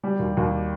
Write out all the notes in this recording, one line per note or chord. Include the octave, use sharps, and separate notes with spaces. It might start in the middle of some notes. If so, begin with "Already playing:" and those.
G3
D#2
D#2